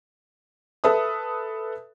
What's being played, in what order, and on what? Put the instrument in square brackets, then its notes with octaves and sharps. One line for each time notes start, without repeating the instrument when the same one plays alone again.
[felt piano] A4 B4 E5 D#6